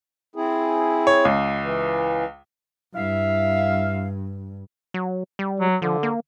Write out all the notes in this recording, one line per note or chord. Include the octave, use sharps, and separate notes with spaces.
C4 E4 G#4
C#5
C#2
E3
G2 E4 E5 F5
F#3
G3
F#3
D3 F3
A#3